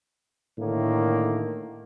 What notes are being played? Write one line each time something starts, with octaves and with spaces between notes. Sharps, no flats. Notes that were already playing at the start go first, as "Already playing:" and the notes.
A2 D3 D#3 A3 A#3